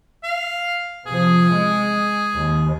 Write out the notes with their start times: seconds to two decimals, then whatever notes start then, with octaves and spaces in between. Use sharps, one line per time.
0.24 F5
1.06 C3 F3 G#4
1.53 G#3
2.35 D#2